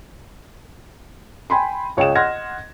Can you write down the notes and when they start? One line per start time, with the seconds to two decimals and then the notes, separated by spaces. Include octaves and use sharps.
1.50 G5 G#5 B5 C6
1.97 C#2 C#5 D#5 G5 D#6 E7
2.15 D#5 F#5 C6 F6 G#6 A#6